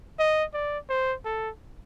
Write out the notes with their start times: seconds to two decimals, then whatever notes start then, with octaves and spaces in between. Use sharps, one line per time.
0.19 D#5
0.54 D5
0.90 C5
1.25 A4